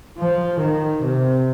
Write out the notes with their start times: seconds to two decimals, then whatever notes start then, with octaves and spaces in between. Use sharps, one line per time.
0.18 F3
0.60 D#3
1.03 C3